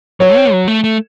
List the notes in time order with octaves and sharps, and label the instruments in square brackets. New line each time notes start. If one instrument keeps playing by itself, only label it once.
[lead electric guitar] F#3 [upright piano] C#5
[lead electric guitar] C4
F#3
A3
A3